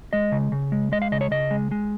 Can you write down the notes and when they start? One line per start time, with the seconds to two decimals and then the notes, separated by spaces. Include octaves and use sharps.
0.13 G#3 D#5
0.32 C#3
0.52 C#3
0.72 G#3
0.92 G#3 D#5
1.02 F5
1.12 C#3 D#5
1.21 C#5
1.31 C#3 D#5
1.51 G#3
1.71 G#3